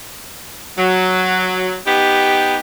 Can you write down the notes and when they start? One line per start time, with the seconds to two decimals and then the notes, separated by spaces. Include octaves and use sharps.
0.77 F#3
1.86 B3 D#4 G4